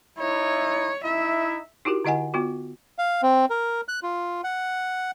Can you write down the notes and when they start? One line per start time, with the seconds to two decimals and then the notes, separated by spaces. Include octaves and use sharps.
0.19 D#4 E4 C#5
1.04 D#4 E4 E5
1.85 D#4 E4 F#4 G4 A#4
2.05 D3 E4 D#5 F#5 G#5
2.34 B3 F4 F#4
2.98 F5
3.22 C4
3.50 A#4
3.88 F#6
4.03 F4
4.44 F#5